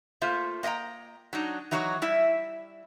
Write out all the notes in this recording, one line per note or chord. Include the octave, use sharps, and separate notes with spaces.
A3 A#3 F4 C5 E5
A#3 D#5 E5 G5 A#5
F#3 D4 D#4
E3 F#3 D#4 F#4 B4 C#5
G3 E4 E5